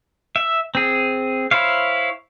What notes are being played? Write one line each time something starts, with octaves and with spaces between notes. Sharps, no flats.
E5
C4 G#4
E4 C5 C#5 F5